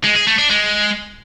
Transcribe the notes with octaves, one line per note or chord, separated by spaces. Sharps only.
G#3
G#4
A3
D4
G#3